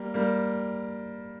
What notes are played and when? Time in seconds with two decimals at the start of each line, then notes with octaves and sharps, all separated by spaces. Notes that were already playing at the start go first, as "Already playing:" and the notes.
Already playing: G3 A#3
0.14 G3 A#3